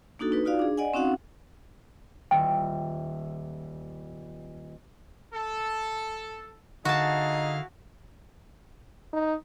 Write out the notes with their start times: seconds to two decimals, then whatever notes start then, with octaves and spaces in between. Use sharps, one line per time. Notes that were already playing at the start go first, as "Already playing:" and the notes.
0.19 A#3 D4 D#4 F#4 A4
0.32 D#4 B4
0.45 D#4 F4 F#4 D5 F5
0.59 D4 G#4
0.77 D5 D#5 F#5 G#5
0.94 C4 C#4 D#4 F#4 F5 F#5
2.31 D#1 E5 G5
5.34 A4
6.85 D3 D#4 E4 F#4 G#4 F5 A5
9.13 D#4